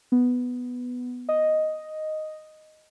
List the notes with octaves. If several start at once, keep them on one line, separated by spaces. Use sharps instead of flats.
B3
D#5